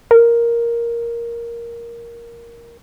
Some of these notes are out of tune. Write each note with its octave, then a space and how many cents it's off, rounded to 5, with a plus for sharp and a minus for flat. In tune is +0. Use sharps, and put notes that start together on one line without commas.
A#4 +5